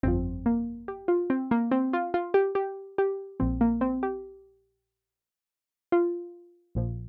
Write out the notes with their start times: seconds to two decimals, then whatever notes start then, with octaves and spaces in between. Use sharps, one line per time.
0.03 G1 F2 F3 C4
0.46 A#3
0.88 G4
1.08 F4
1.30 C4
1.51 A#3
1.71 C4
1.93 F4
2.14 F4
2.34 G4
2.55 G4
2.98 G4
3.40 A#1 A#2 F3 C4
3.61 A#3
3.81 C4
4.03 G4
5.92 F4
6.75 A#1 A#2 F3